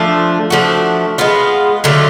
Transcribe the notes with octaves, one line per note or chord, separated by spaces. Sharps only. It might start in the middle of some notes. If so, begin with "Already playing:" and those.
Already playing: F3 A3 D4 F4
F3 A3 D4 F#4
G#3 B3 F4
D3 F#3 A3 F4